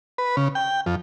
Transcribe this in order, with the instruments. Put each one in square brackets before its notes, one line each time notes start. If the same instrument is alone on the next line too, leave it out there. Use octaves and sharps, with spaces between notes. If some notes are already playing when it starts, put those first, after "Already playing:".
[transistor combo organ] B4
C#3
G5
F2